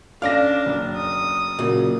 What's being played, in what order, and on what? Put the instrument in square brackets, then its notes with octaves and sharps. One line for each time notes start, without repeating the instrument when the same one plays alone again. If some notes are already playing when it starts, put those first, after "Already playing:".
[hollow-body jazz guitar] C#4 D5 F5 [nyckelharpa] D4 [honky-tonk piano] F6 A#6
[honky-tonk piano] F#1
[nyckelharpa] D#6
[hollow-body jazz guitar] A#2 C#3 F#3 [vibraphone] F#4 A#4